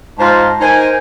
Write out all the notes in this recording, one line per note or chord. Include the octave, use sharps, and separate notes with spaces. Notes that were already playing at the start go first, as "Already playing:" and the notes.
G#2 F4 C5 F5 A5 A#5
D#4 A#4 C5 G#5